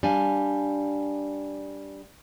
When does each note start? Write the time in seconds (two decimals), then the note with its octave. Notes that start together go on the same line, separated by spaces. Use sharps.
0.03 G3 D4 F5 G#5